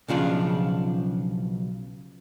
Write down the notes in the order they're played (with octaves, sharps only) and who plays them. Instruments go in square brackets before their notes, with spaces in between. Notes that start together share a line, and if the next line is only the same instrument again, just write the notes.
[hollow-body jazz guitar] B1 C#3 F3 D4